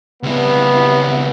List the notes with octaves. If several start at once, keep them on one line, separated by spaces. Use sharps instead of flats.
C#2 G3 B3 E4